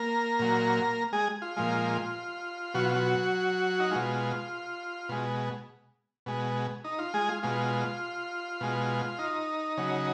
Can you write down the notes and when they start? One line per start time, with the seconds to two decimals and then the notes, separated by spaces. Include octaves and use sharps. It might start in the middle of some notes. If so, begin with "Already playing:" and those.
Already playing: A#3 A#4
0.39 A#2 F#3
1.13 G#3 G#4
1.42 F4
1.56 A#2 F3 G#3
2.74 B2 F#3 F#4
2.85 F4
2.94 F#3 F#4
3.80 D#4
3.91 B2 G#3 F4
5.09 B2 G#3
6.26 B2 G#3
6.84 D#4
6.99 F4
7.14 G#3 G#4
7.29 F4
7.43 B2 G#3 F4
8.61 B2 G#3
9.19 D#4
9.77 C#3 F#3